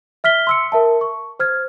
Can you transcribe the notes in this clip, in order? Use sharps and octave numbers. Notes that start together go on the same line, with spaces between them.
E5 F6 B6 G7
C6 E6 C#7
A#4 E5 A5
C#6
C5 F6 G#6